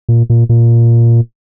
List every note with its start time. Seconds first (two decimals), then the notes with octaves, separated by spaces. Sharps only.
0.09 A#2
0.30 A#2
0.49 A#2